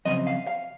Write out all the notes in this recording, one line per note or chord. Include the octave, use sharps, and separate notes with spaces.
F2 C#3 F#3 C4 D#5
F5
F5